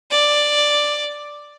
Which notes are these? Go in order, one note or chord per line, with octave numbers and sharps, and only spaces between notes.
D5